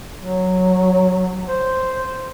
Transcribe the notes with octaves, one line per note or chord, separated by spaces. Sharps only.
F#3
C5